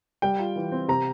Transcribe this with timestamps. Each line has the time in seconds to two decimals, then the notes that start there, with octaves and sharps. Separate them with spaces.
0.22 G3 G5
0.39 F4
0.56 E3
0.72 C4
0.88 C3 A#5